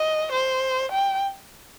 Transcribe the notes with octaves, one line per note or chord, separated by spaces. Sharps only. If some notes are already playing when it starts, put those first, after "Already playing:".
Already playing: D#5
C5
G5